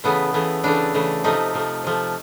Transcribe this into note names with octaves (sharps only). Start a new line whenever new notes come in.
C#3 E3 A3 B3
C#3 E3 A3
C#3 E3 A3 D4
C#3 E3 A3
C3 F3 A3 D#4
C3 F3 A3
C3 F3 A3